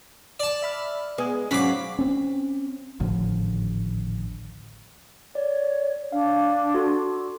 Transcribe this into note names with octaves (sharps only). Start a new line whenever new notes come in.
D5 A5
E5 B5 F6
G#3 B3 G#4
G#2 F#3 C#4 F#4 F5 B5 D6
C4 C#4
G#1 D2 A2 F3
C#5 D5
D4 F5
F#4 A4 C6